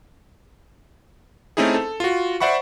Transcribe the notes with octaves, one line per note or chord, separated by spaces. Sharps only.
A3 C4 C#4 D#4 E4 G#4
A4
F4 F#4
C5 D5 E5 F#5 B5 C#6